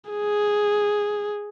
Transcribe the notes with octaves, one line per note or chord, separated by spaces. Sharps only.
G#4